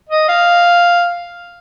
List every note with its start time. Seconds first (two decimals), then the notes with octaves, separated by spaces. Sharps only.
0.09 D#5
0.28 F5